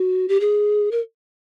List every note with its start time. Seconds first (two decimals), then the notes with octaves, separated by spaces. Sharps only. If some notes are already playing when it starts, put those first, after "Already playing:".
Already playing: F#4
0.28 G4
0.40 G#4
0.91 A#4